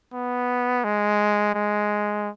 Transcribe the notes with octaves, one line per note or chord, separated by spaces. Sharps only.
B3
G#3
G#3